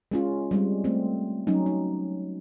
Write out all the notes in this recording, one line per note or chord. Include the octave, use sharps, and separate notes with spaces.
G#3 C#4 F4
G3 G#3 C4
A3 C4
F#3 C#4 D#4
D#4